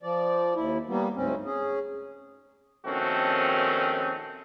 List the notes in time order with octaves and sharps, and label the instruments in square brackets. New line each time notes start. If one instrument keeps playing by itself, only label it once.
[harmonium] F3 D5
D#2 E4
G3 A#3 B3
D2 G#2 C4 C#4
C#4 G#4
[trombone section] A#1 D#3 A3 C4 C#4 F#4